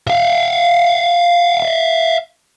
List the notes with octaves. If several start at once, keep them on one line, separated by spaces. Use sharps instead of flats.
E5 F5